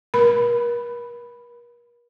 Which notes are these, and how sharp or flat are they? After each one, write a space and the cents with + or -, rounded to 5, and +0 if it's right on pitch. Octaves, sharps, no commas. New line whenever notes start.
A#4 +40 B5 +0